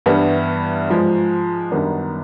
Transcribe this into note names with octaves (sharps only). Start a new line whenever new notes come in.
G2 E3 G3 B3 E4
G#2 F3 G#3
F#2 D#3 G3 B3 D4